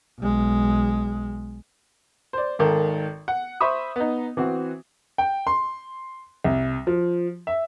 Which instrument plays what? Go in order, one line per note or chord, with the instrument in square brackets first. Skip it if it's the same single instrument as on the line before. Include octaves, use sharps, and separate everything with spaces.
[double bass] B1 G#3
[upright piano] C5 D5
G#1 D#3 A4 A#4
F#5
C5 E5 B5 C#6 D#6
B3 D#4
E3 C4 F#4
G5
C6
C2
F3
E5